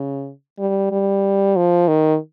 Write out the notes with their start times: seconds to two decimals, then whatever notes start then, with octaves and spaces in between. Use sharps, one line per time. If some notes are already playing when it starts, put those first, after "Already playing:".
Already playing: C#3
0.59 G3
0.91 G3
1.56 F3
1.88 D#3